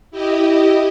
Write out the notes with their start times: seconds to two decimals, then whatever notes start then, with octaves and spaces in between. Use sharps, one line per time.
0.11 E4 G4 D#5